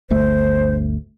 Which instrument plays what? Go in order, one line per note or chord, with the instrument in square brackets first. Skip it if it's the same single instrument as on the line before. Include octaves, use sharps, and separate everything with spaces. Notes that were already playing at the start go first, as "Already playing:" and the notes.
[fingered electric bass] G1 D2 A3 [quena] C5